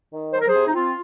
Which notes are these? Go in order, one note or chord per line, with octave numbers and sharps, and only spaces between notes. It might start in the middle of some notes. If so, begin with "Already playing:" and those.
D#3
F#3 C5
A#4
G#4 C5
C3
D#4
C4 F4